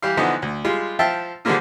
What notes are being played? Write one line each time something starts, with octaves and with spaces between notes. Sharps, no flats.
E3 G3 G4 F5
D3 E3 F3 B3 D#4
D2
G3 G#3 F4
F3 E5 F5 G5 A5
D3 F3 G3 G#3 A#3 F4